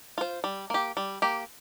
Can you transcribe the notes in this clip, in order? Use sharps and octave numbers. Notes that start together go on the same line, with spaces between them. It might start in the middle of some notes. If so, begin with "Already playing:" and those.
F4 C5
G3
A#3 G4
G3
A#3 G4